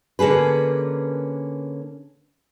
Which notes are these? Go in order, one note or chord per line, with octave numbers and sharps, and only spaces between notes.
D3 A#3 C#4 G#4 B4